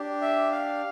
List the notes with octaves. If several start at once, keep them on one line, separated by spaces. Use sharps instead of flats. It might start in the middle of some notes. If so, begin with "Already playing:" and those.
Already playing: D4 G4
E5
F5